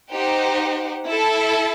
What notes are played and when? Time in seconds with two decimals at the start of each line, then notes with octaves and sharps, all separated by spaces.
0.11 D#4 G4 C5 F#5
1.07 E4 A4 E5 A5